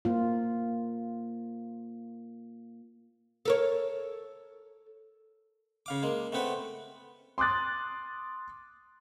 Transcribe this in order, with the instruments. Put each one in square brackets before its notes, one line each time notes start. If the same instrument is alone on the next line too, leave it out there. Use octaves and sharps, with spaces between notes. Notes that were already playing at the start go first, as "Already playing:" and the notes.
[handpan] A#3 F4
[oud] A4 A#4 C#5
[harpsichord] C#3 F5 D6
G#3 A#3
A3 B3 C4 B4 F#5
[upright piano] C6 D6 D#6 F#6 A6